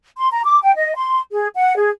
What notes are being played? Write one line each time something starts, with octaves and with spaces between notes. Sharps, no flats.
C6
A#5
D6
G5
D#5
C6
G#4
F#5
G#4